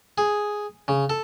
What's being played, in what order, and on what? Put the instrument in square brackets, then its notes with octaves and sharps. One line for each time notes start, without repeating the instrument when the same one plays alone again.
[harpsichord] G#4
C#3
A4